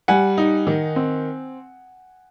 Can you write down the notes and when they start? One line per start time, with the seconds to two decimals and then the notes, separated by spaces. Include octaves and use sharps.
0.08 G3 F#5 G#5
0.38 D#4
0.67 D#3
0.96 C4